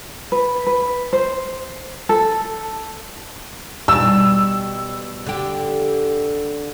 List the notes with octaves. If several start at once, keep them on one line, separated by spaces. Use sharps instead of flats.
B4
B4
C5
A4
B2 G3 E6
D3 G4